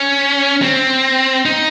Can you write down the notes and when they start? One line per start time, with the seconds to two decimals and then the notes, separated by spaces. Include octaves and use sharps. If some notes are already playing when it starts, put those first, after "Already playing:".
Already playing: C#4
0.62 C4
1.45 D#4